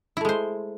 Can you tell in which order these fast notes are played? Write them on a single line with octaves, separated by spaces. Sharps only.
E4 A3 G#3 C5